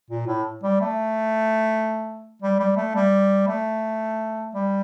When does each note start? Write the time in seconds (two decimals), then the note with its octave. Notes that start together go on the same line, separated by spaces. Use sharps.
0.10 A#2
0.27 A2
0.63 G3
0.81 A3
2.42 G3
2.60 G3
2.76 A3
2.95 G3
3.48 A3
4.55 G3